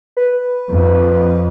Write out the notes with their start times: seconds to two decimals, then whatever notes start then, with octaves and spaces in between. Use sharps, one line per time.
0.17 B4
0.70 F2